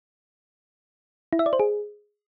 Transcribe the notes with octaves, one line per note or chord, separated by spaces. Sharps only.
E4
E5
D5
C5
G#4